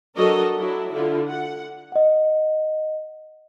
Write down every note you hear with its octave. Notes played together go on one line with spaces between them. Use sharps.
F#3 D4 F#4 A4 A#4 D#5
F#3 D4 E4
D3 E4 F4
F#5
D#5 F#5